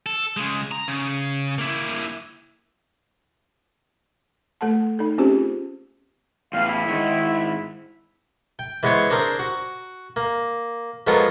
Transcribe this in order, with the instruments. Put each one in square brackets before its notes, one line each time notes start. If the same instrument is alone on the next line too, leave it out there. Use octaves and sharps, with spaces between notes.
[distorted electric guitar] A4
C#3 G#3
A#5
C#3
A#3 E4
[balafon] A3 A4 F#5 A5
D#4 A4
C4 C#4 F4 G4 G#4 C5
[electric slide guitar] E2 A2 [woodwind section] F5
[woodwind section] E4
[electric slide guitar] G#2 D#3
[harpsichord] G5
E3 G#3 B3 C5 C#5
C4 D4 G#4 A#4 C5
F#4
A#3
F3 F#3 G#3 B3 A4 A#4